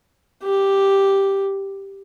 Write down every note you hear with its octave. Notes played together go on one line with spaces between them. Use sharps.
G4